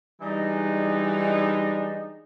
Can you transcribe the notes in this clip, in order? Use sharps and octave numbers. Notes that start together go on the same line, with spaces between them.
E3 G3 G#3 D4 D#4